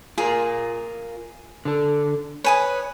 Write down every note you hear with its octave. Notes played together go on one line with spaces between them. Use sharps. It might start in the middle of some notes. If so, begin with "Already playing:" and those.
F4 G#4 A#4
D3 A4
B4 C#5 G#5 D#6